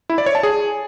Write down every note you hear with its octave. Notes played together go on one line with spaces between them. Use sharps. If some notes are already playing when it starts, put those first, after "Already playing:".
E4
D5
C#5
A5
G#4